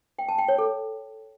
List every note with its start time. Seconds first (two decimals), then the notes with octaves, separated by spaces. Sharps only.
0.19 G5
0.28 A5
0.38 G5
0.48 C#5
0.58 A4